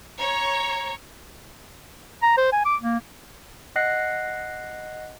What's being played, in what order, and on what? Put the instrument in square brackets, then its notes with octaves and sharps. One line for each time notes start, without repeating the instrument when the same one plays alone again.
[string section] C#5 [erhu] A#5
[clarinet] A#5
C5
G#5
D6
A#3
[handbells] D#5 F#5 F#6 A#6 C7